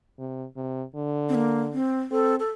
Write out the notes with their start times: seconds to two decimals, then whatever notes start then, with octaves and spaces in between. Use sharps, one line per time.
0.19 C3
0.56 C3
0.95 D3
1.29 C4
1.35 A#3
1.73 C4
2.11 C4 A4
2.39 A4